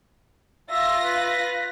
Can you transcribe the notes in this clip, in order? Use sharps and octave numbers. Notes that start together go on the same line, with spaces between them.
F4 E5 A#6
B4